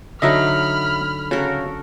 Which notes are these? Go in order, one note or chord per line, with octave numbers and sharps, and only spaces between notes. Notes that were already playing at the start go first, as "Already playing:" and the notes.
D3 F#3 D#4 D#5 E5 A#5 B5 F6
C#3 F#4 A4 A#4